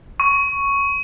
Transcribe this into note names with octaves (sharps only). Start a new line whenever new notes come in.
C#6